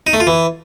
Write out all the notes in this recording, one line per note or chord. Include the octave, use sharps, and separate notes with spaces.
D#4
A3
F4
E3